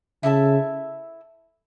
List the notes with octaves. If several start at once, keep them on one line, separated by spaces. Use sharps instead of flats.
C#3 E4 A4 E5 A5